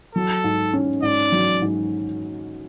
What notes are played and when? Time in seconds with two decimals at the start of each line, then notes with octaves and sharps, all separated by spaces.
0.15 F#3 A4
0.44 G#2
0.73 C#4
1.02 G#2 D5
1.32 F#3
1.62 G#2